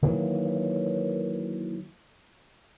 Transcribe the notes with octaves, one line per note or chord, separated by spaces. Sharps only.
D#3 E3 F#3 A#3